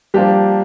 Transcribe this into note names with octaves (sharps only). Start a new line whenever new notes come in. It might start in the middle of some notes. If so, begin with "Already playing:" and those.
F3 G3 A#3 D4 G4